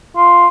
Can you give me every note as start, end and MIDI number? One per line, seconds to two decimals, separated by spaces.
0.16 0.47 65